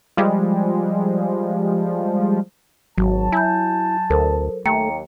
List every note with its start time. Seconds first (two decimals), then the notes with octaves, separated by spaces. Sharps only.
0.17 F3 G3 G#3
2.98 G#1 F#3 A5
3.32 E4 G#5 G6
4.10 D2 A4 A#4 C5
4.66 D#2 A3 G5 A#5 C#7